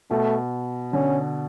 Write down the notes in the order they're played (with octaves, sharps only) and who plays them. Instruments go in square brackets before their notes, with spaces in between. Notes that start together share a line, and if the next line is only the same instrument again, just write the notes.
[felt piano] B2 [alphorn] A3
[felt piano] D3 [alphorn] C#4